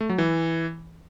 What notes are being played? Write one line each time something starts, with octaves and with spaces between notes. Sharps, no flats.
A3
F#3
E3